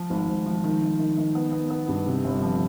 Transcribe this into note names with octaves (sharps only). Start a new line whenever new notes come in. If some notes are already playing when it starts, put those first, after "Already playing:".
Already playing: F3
G#1
G#1
F3
D#3
D#3
D#3
D#3
B3
B3
B3
G2
C3
G1
F3